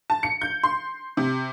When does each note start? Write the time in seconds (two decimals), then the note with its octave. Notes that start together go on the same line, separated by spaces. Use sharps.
0.10 A5
0.23 C#7
0.41 G6
0.63 C6
1.17 C3